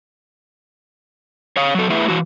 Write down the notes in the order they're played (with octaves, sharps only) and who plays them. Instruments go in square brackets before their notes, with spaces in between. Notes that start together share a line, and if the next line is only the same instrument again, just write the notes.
[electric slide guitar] C#5 F5
F#3 A4
A3 E4 G#4 B4 E5
E3 F#4